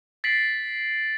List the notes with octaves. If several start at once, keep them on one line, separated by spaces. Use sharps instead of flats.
A6 B6 C7 D7 F#7